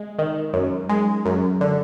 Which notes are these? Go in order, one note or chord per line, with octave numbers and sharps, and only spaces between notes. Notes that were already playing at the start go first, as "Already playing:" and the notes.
Already playing: G#3
D#3
F#2
G#3
F#2
D3